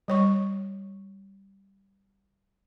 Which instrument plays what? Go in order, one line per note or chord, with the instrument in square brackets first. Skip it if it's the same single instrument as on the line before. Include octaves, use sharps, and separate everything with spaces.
[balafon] G3 C#5 C#6